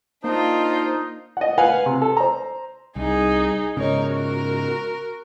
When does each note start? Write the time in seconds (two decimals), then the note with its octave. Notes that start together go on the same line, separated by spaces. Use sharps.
0.24 A#3 D4 D#4 F4 C5
1.37 D#5 F#5
1.58 B4 F5 F#5 G#5
1.86 C3
2.02 A4
2.17 C5 A#5
2.96 C2 D#4 G#4
3.77 G#2 C#3 D#4 A#4 C#5
4.09 F#4 A#4